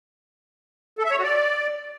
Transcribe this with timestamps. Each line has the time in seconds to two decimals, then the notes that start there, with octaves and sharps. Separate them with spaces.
0.98 A4
1.05 E5
1.11 C#5
1.17 F#4
1.23 D5